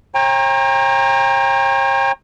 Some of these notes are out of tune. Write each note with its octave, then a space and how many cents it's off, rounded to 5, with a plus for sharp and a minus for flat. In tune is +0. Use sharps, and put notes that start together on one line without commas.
C#5 -40 G5 +30 A#5 +0